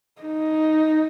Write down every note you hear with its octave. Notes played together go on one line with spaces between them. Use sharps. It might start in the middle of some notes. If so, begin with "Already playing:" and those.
D#4